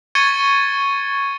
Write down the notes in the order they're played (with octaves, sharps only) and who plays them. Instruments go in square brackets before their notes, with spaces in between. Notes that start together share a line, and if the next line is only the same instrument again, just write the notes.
[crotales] C#6 G#6 A6 C#7 D#7 G7